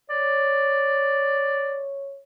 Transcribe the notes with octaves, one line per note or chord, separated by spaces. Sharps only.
C#5 D5